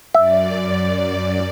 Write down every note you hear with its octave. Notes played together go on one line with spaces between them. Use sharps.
F#2 D5 E5